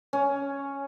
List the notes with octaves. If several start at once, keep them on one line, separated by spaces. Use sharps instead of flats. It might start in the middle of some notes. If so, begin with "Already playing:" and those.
C#4